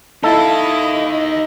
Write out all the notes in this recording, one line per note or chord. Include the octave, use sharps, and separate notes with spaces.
D#4 E4 A4 D#5 F5